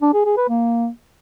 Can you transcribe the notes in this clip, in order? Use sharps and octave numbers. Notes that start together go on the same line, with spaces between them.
D4
G#4
G#4
B4
A#3